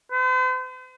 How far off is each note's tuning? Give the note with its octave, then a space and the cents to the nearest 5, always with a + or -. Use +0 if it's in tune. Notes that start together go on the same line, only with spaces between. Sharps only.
C5 -45